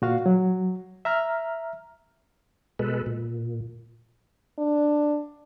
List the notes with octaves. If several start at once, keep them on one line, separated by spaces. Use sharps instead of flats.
A#2 F#4 F5
F#3
E5 A#5 F6
B2 G#3 A4 B4
A#2
D4